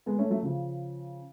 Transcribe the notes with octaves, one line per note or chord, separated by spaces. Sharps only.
G#3 B3
A3 C#4
F#3 A3
C#3 F3